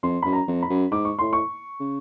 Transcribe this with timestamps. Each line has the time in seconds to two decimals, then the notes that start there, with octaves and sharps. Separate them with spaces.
0.03 F2 C6
0.22 F#2 B5
0.33 A#5
0.48 F2
0.62 B5
0.70 F#2
0.91 G#2 D6
1.05 C#6
1.19 A2 C6
1.33 C#6
1.80 C#3